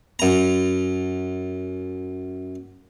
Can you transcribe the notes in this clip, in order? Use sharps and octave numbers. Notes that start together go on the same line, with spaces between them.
F#2 A#5